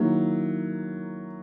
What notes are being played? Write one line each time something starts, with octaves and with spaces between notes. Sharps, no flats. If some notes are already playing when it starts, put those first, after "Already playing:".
Already playing: D#3 F#3 A#3 E4